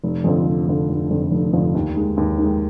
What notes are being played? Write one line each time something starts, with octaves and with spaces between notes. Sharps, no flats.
F1
F2 D3 F3
F1
F2 D3 F3
F1
F2 D3 F3
F1
F2 D3 F3
D#2
D#3 G#3
D#2
D#3 G#3